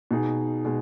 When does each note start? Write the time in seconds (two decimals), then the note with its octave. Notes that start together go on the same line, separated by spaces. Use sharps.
0.11 B2 G#3 D#4 G#4
0.65 B2 G#3